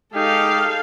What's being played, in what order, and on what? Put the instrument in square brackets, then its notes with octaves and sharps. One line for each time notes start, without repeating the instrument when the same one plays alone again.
[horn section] G#3 D#4 G4 [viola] A4 F5